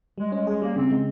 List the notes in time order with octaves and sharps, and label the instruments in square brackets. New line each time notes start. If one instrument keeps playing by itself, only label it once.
[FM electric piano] G3 [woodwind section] G#3
[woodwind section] G#3 [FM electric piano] C#4
[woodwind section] G#3 [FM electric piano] G#4
[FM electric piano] G3 [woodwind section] A#3
[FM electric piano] C#3 [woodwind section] C4
[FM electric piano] G#3